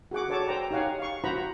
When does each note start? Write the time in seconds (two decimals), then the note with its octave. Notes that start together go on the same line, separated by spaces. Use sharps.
0.11 F#4 G#4 F#5 D6
0.29 F#4 A4 C#5 D5 A5 D6
0.48 C5 G5 A#5
0.71 D#4 G4 C#5 F5 F#5 G#5
0.99 F5 C#6
1.24 F4 F#4 C5 F#5 A#5 B5